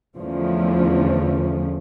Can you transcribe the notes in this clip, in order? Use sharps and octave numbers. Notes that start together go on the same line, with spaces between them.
E2 D3 F3 A3 C#4